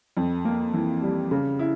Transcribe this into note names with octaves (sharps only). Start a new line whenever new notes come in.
F2
A#3
E3
G3
C#3
E4